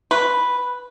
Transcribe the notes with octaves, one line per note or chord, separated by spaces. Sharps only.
B4